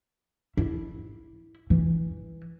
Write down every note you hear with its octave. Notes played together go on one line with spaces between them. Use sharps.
E4
E3